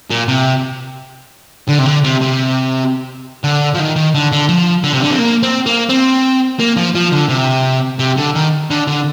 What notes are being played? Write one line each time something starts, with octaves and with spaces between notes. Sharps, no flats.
A#2
C3
D3
C3
D3
C3
C3
D3
F3
D#3
D#3
D3
D3
F3
D3
C3
D3
C4
A#3
C4
A#3
C4
A#3
F3
F3
D3
C3
C3
D3
D#3
D3
D3